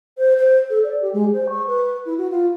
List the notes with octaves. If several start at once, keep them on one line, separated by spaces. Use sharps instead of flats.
C5
C5
A4
D5
G4
G#3
C5
C#6
B4
E4
F#4
F4